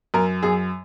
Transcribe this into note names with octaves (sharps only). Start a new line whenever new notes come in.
F#2 A#4
F#2 G#4